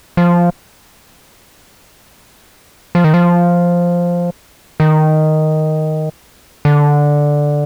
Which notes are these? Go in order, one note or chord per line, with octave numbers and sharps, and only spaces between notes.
F3
F3
D#3
F3
D#3
D3